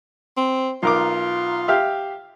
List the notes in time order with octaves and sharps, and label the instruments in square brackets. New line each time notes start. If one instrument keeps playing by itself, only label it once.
[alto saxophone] C4
[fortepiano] B1 A#4 D6 [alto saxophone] F4
[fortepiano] G4 E5 F5